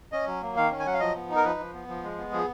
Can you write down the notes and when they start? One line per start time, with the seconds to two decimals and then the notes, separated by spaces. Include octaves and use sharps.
0.12 C#4 D#5
0.27 F#3
0.42 A#3
0.56 D#3 F5
0.71 C#4
0.79 G#5
0.86 F#3 F#5
0.94 F5
1.00 F3 D#5
1.16 B3
1.29 D#4
1.36 A#4
1.44 F3 B4
1.59 F3
1.74 B3
1.88 F3
2.03 G#3
2.18 B3
2.33 F3 G#4